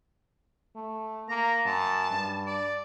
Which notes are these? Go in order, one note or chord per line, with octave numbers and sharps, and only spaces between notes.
A3
A#3 A#5
F#2 A5
G2
D5